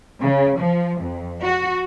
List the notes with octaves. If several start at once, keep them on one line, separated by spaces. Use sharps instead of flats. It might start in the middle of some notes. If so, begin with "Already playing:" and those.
C#3
F3
F2
F#4